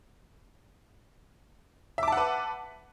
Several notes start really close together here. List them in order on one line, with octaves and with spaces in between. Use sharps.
E5 D6 A5 F#5 B4